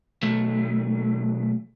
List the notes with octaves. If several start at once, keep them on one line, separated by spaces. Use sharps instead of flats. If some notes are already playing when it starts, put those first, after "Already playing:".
B1 A3